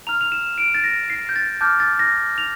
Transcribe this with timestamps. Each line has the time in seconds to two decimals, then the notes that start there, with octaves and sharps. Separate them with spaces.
0.07 A#5 F6 F7
0.21 F7
0.32 E7
0.58 D7
0.75 A6
0.84 A#6
1.10 C7
1.29 G6
1.36 A6
1.61 A5 D6 F6 G6
1.80 A6
1.99 A#6
2.38 F7